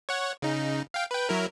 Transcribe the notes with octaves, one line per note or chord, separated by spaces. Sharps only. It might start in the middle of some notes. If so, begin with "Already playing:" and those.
C#5 F#5
C#3 D#4
F5 G5
B4 G5
F#3 E4 A#4